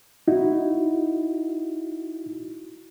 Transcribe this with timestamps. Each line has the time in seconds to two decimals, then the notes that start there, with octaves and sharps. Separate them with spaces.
0.28 D#4 E4 F#4